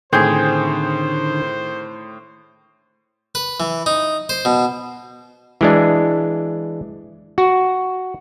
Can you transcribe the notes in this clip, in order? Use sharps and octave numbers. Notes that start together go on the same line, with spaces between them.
A2 D3 D#3 C4 G#4 C5 G6
B4
E3
D#4
C5
B2
E3 G#3 D4
F#4